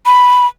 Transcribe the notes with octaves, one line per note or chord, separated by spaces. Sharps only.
B5